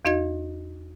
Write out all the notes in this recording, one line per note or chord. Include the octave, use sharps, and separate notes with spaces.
E2 D#4 F#4 D#5 G#6